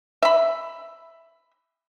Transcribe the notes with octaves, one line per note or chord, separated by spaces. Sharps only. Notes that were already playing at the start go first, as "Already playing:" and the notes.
E5 B5